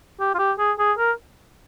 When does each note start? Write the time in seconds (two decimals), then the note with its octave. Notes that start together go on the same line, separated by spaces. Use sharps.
0.20 G4
0.35 F4
0.39 G4
0.59 G#4
0.79 G#4
0.98 A#4